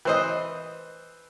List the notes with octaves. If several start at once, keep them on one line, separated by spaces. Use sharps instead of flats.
E3 C5 D#5